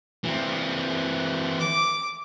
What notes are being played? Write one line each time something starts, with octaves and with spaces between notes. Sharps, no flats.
E3 C4
D6